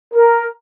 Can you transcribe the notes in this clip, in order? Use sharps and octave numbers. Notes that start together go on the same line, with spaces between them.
A#4